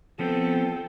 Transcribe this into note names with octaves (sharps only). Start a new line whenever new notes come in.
F3 B3 C4 A4 G5